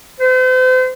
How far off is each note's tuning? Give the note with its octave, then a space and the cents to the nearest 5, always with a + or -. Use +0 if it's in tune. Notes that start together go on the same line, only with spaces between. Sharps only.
C5 -40